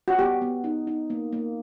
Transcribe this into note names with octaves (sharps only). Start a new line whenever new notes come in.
F#4
B3 G4
B3
D#4
D#4
A#3
A#3